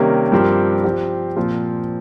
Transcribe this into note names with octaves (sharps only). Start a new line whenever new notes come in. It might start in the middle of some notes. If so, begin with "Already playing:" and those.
Already playing: C3 D#3 G3 A#3 C#4
G2 F3 C4 G4 A#4
F3 C4 G4
A#2 F3 C4 F4